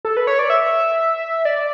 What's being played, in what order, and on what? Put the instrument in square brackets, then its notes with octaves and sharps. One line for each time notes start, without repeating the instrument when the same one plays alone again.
[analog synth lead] A4
B4
C#5
D5
E5
D5